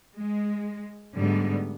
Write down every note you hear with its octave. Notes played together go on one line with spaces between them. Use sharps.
G#3
G#2 D3 G3 A3 B3